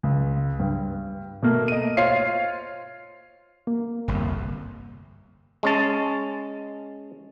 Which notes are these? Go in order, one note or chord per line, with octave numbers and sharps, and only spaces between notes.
C#2
G2
B2 A3 A#3
D#5 D#7
F4 C5 C#5 F5 C7
A#3
G1 C2 F2
G#3 C#4 A5